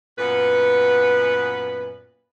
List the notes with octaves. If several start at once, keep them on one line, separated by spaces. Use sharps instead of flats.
F#2 A#2 B3 B4